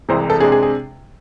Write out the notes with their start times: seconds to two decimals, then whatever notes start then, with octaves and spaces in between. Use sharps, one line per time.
0.09 C2 C3 E3 G#3 C5
0.30 A4
0.40 C3 G#3 D4 G#4
0.52 G#4
0.63 G#4